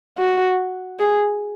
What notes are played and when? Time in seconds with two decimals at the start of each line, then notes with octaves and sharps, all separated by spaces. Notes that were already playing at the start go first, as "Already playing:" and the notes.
0.18 F#4
1.00 G#4